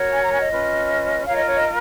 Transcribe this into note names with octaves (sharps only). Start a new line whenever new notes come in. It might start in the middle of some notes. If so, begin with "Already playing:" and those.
Already playing: F#4 A#4 C#5
G#5
A#5
G#5
D#5
C#4 F4 B4
F4 A#4 C#5 F5
D#5
C#5
D#5